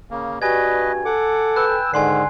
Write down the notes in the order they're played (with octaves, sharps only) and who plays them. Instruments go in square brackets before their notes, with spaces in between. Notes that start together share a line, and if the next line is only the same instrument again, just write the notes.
[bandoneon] C#3 A#3
[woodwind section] G2 F#4 [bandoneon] B4 D#5 [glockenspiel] G#5 G#6
[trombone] A4 [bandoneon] F#5 D6
[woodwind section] B4 G5 E6 [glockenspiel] F#6
[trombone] G#2 [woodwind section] D3 [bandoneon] D#3 [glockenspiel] G#5 C6 C7